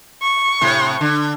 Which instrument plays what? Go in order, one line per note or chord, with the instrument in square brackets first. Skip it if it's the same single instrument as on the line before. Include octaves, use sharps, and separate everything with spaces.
[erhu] C#6
[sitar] A2 C3
D3